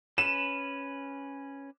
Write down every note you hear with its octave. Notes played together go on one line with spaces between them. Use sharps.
C#4 B4 E7